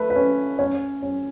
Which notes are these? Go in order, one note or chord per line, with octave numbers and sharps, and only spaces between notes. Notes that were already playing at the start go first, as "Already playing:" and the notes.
Already playing: A3 B4
B4
C#4
C#4 C#5
C#4